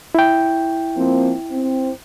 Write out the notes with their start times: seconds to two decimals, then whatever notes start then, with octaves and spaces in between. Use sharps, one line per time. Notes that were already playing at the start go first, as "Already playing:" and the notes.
0.15 E4 G5
0.96 F3 A#3 C4
1.51 C4